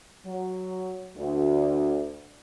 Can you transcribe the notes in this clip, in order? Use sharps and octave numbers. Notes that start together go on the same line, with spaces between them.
F#3
D2